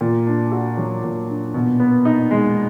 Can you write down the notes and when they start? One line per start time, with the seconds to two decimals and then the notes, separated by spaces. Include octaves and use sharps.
0.01 A#2
0.27 D4
0.52 F#4
0.77 F#3
1.04 A#2
1.29 D4
1.54 B2
1.80 B3
2.05 D#4
2.31 G#3